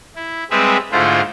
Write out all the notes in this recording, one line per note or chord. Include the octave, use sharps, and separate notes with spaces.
E4
G3 G#3 C4 G#4 B4 E5
G#2 D3 A3 E4 F4 C5